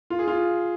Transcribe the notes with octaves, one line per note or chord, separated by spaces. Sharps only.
F4
G#4
F4